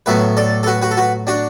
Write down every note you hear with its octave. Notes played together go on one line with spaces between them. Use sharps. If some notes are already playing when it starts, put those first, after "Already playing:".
A2 F#3 B3 B4 E5
A4 D5
A4
F#4 B4
F#4 B4
A4
F#4 B4
D4 F#4